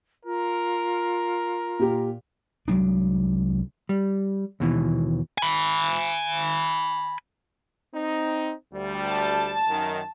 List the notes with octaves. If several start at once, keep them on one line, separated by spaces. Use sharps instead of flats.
F4 A#4
A#2 G4
C2 F#3 G#3 D4
G3
D#2 B2 E3
G#5 B5
C4 D#4
D2 G3
A5
F#2 D#3